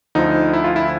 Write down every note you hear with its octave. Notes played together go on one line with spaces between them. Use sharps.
D2 D3 F3 D#4
E4
F4
E4